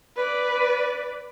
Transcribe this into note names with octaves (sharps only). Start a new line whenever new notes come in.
B4 D5